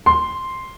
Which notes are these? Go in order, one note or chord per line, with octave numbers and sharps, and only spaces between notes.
C6